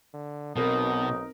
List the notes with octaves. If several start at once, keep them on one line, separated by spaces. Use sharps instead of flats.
D3
B1 B2 C4 D#4 A#4